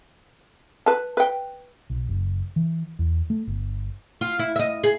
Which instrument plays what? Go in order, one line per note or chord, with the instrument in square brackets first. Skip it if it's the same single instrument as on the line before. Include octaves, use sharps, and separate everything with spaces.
[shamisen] B4 A5
B4 G5
[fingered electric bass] B1
F#1
E3
E2
A3
G1
[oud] F4
E4
D#5 E5
G#4